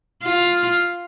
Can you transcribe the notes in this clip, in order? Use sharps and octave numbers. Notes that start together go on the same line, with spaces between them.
F4